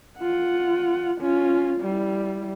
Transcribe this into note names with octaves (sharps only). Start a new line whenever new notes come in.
F4 F#5
C#4 F4
G3 E4